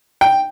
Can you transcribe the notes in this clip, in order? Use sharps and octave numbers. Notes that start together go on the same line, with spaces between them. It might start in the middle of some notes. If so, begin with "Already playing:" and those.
G5